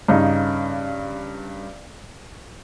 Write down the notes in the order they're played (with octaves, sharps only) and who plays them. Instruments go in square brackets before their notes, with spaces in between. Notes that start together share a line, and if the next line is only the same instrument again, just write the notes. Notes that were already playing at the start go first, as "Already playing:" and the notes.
[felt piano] G2 C#3 D#4